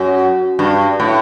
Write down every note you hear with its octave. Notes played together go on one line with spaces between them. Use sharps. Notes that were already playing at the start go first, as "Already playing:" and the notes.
Already playing: F#2
G2
A2